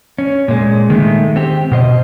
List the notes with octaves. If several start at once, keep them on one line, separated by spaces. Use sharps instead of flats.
C#4
A#2 G#3
D#3 G#3 A3
C4 G4
B2 C5 D#5